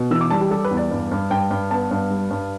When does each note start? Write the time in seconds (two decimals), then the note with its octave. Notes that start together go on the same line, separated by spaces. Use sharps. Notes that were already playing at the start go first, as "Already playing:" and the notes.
Already playing: B2
0.11 E3 E6
0.21 D6
0.31 G3 A5
0.41 G4
0.51 G3 A4
0.65 B4
0.71 E2
0.77 D5
0.91 G2
1.11 G2
1.30 G2 G5
1.51 G2
1.71 B3 A5
1.91 G2
2.10 G3
2.30 G2